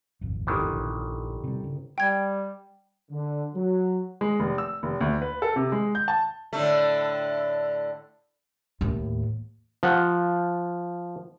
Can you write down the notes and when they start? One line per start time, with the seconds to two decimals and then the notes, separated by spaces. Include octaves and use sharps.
0.21 D#1 G#1 F2
0.47 G1 D#3 E3
0.72 A#1
1.44 C3 G3
1.64 C#3
1.98 G3 G5 G#6
3.11 D3
3.54 F#3
4.21 G#3
4.40 F1
4.58 E6
4.83 F1
5.01 D2
5.22 B4
5.42 A4
5.56 C3
5.72 G#3
5.95 G6
6.08 A5
6.53 A2 D3 A3
8.81 D#2 A2
9.83 F3 F#5